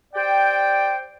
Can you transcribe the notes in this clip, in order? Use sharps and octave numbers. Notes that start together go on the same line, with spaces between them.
G4 C5 D5 G5